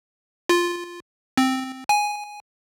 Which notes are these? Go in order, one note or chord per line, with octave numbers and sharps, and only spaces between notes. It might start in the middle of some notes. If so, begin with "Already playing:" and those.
F4
C4
G#5